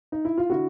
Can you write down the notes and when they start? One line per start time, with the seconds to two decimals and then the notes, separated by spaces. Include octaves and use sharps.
0.12 D#4
0.25 E4
0.38 F4
0.50 D3 E4 F#4